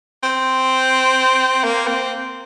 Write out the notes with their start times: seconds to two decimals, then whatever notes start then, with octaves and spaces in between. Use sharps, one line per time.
0.23 C4
1.64 A#3
1.87 C4